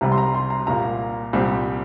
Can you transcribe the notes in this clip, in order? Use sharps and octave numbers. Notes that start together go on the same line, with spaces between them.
C2 C3 G3 A#5
C6
A#5
C6
A#5
C2 A#2 A#3 A#5
C2 A#2 G3 C4